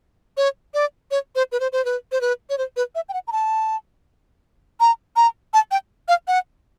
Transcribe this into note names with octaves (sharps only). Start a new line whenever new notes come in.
C#5
D5
C#5
C5
B4
C5
C5
B4
C5
B4
C#5
C5
B4
E5
G5
F#5
A#5
A5
A#5
A#5
A5
G5
F5
F#5